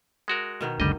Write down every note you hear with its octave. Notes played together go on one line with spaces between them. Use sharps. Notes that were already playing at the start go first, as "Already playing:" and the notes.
G#3 F#4 A#4
B2 D#3 B3
F#1 C#2 D3 G3 D#5